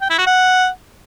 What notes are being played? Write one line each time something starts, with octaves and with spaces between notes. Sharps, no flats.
G5
E4
F#4
F#5